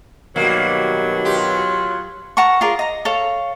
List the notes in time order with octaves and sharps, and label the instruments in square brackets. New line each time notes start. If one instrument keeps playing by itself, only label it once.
[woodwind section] B2 D#3 [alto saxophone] F#3 [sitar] G3 A#3
[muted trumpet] F4 [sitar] G4
[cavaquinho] A#4 F#5 A5 C#6
F4 G#4 A#4 D5
D#5 A#5
A4 C#5 F5